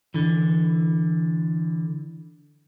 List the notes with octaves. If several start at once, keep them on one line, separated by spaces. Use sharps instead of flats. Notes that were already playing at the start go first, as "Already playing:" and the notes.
D3 E3